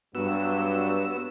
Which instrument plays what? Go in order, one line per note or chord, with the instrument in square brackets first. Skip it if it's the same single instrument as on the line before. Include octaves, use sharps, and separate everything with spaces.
[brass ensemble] G2 F#3 [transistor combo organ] B3 F#4 E6